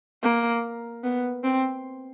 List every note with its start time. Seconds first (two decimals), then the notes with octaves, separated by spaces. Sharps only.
0.23 A#3
1.03 B3
1.44 C4